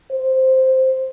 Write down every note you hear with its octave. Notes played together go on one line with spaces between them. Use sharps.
C5